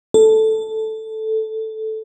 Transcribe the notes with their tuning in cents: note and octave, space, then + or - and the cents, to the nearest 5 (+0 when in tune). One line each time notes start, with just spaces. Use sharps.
A4 -5